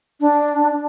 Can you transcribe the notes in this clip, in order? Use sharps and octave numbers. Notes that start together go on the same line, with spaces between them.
D4